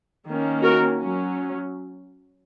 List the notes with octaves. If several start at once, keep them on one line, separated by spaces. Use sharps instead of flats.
D#3 A#3 C#4
F#4 A#4
F#3 C#4